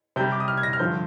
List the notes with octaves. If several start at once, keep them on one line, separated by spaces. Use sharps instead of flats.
C3 G3 G6
D6
D#6
F6
G#6
A#6
F6
G2 D3 F3 G6